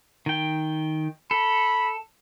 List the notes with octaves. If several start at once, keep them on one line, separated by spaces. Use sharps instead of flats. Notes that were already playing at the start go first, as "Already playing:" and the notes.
D#3 G5
A4 B5